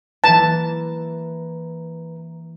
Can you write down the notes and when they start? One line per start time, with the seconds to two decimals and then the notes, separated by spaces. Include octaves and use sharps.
0.24 E3 A#3 E4 B4 A5 A#5